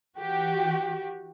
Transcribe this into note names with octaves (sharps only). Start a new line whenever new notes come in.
E3 F#4 G4